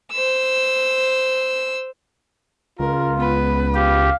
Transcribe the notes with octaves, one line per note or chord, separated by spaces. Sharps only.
C5 E6
C#2 F4 A#4
B3 B4
G4 F5